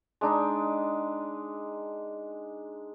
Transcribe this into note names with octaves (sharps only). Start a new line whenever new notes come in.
G#3 D4 D#4